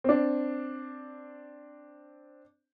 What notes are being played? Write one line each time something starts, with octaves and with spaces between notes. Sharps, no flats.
C4 D4